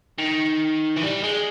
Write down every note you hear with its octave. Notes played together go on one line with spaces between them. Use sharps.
D#3
E3
G3
G#3